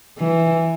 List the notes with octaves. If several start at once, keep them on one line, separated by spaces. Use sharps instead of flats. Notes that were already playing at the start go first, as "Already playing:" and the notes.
E3